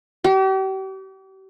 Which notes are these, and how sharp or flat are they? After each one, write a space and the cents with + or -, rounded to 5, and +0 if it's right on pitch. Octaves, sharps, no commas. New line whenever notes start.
G4 -40